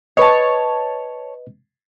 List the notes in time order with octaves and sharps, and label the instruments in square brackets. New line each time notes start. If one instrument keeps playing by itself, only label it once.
[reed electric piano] B4 D#5 [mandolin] C#5 A5